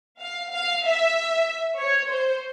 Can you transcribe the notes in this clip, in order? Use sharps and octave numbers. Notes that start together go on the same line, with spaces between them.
F5
F5
E5
C#5
C5